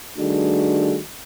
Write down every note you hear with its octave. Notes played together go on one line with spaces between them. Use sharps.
D#3 G3 A3 D4 F#4 G#4